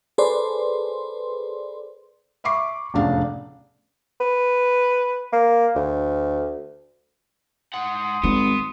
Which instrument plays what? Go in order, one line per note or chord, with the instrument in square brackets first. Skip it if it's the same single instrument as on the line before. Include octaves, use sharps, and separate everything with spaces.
[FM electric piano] G#4 A4 B4 C5 D5 C6
[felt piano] E5 B5 C#6 D6 C7
F1 E2 A2 C#3 D4 F5
[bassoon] B4
A#3
D2
[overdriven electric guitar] G#2 F#5 [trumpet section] C6 D#6
[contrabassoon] G#1 [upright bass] G3 [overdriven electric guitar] B3